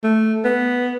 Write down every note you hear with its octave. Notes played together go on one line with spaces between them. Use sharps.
A3
B3